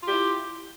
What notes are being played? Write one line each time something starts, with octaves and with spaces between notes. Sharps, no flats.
E4 F4 G4